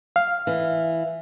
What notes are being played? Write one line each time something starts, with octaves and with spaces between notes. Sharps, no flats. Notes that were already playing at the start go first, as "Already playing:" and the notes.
F5
E3